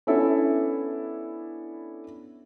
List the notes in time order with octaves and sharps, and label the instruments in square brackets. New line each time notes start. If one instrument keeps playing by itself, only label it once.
[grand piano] B3 C#4 D4 E4 A4